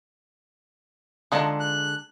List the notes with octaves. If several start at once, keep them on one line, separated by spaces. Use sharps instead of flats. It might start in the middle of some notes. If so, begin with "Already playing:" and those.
D3 F3 G#3 D4 D#4 A5
F#6